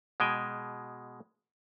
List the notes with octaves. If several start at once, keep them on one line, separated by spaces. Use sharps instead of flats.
B2 G#3 G5 G#5